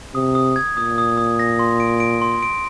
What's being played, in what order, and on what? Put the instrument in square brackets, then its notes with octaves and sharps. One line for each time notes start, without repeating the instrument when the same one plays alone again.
[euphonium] C3 [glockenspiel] D#6
[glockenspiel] D#6
G#6
[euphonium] A#2 [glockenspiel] D#6
[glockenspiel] D#6
D#6
A#6
C6
D7
D7
C6
D7